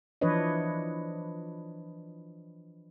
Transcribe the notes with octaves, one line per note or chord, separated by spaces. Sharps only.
E3 F3 D4 B4 C#5 D#5